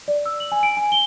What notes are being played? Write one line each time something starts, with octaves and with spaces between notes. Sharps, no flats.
D5
E6
F#7
G#5
D7
G#5
G7